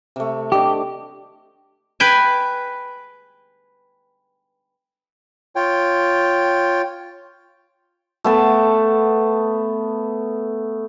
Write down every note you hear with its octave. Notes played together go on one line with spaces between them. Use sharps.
C3 A3
D4 G4 D#5 D6
B4 G5 G#5
F4 C#5 G5
A3 B3 A5